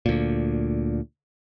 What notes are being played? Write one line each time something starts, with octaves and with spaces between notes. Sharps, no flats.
D2 A#2